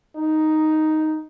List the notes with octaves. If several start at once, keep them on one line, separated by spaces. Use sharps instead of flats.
D#4